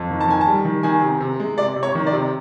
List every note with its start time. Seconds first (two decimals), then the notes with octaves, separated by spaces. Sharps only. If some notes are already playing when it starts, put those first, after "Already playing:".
Already playing: F2
0.10 D#3
0.21 A5
0.28 D#3 G#5
0.41 A5
0.47 G3
0.65 D#3
0.83 D#3 G#5
1.02 C3
1.20 C3
1.40 G#3
1.58 C3 D5
1.76 C3
1.83 C#5
1.95 D#3
2.07 D5
2.13 C3